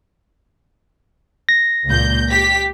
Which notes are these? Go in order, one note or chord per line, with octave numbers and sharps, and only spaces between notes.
A#6
C#2 A#2 G6
G4 B6